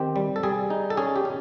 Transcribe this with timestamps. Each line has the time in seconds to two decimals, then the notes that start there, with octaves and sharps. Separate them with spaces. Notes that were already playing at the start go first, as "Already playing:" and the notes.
Already playing: D#3 C4 G4
0.16 G3
0.36 A4
0.43 G3 G#4
0.70 D#4
0.90 A4
0.97 C#4 G#4
1.16 G4
1.25 C#4